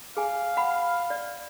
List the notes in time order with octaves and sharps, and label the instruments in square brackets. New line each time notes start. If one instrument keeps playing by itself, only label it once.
[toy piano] G#4 G#5 [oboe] F5
[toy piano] F#5 B5
D5